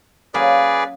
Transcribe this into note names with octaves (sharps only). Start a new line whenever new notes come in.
F#3 A#3 C#4 G#4 B4 D5